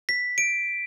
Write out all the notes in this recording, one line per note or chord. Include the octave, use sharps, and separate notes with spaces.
B6
D7